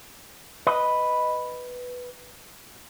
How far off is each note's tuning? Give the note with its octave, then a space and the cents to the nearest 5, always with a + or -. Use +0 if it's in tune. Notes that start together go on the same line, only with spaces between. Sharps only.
B4 +0 D#5 +0